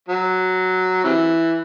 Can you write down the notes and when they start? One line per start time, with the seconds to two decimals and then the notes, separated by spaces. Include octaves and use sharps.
0.09 F#3
1.04 C3 E3